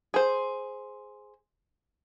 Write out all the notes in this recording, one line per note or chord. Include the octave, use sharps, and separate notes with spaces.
G#4 C5